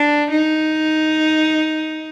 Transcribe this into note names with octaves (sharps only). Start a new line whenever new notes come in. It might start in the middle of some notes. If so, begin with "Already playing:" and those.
Already playing: D4
D#4